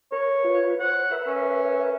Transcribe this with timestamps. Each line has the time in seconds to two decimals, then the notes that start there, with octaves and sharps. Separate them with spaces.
0.12 A#4 C#5
0.44 F4 B4
0.80 C5 C#5 F#5
1.11 A#4 B4 E5
1.27 C#4